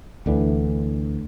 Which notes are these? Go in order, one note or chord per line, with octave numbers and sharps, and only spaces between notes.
D2 D3 E3